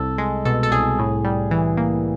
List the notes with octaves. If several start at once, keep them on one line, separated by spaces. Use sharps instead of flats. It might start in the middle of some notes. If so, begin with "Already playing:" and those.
Already playing: C2 A4
G#3
B2 A4
A4
C2 G#4
A2
G3
E3
A#3